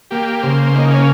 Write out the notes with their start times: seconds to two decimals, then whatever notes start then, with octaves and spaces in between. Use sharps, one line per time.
0.11 A#3 G4
0.43 C#3 C5
0.75 A#3 D#4
0.91 C#4